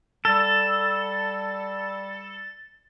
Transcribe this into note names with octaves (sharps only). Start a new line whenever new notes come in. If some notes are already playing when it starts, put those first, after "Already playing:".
G3 A4 A6